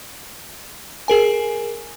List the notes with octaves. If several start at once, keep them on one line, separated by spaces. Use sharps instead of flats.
G#4 A#4 G#5